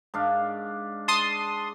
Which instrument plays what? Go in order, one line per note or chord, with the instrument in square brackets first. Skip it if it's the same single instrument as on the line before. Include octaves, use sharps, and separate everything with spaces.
[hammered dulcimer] G#2 D4 F5
[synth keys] A5 C6 D#6